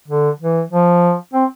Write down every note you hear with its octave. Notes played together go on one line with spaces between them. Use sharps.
D3
E3
F3
C4